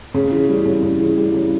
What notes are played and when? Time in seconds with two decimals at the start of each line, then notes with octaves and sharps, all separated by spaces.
0.14 C#3
0.31 E3
0.49 G3
0.66 C#3
0.82 C#3
1.00 E3
1.18 G3
1.34 C#3